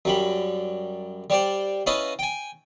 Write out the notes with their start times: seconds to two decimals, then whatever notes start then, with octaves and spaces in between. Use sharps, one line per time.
0.05 F#2 G3 B5
1.30 G3 G4 C5 D5
1.87 C#4 E4 B4 D#5 F5 A5
2.19 G5 G#5